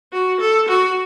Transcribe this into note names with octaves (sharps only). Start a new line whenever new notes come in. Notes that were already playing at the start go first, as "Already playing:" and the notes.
F#4
A4
F#4